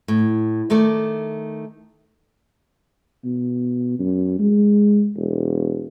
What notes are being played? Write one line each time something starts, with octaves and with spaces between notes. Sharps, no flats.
A2
D#3 A3 A4 D5
B2
F#2
G#3
E1